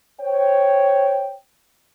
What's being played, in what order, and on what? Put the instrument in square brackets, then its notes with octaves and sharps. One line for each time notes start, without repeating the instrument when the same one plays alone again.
[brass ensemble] C5 C#5 G5